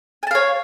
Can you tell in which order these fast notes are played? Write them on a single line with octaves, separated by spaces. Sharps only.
G#5 A5 F5 C#5